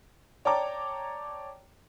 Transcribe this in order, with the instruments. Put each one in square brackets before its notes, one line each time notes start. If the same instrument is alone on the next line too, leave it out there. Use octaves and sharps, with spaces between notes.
[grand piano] C#5 D5 G5 A5 A#5 D6